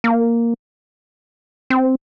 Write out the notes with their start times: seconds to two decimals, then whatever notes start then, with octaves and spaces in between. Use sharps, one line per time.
0.04 A#3
1.70 C4